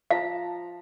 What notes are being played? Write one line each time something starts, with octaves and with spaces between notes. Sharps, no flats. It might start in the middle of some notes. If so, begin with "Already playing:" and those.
F3 F5 A5 A#5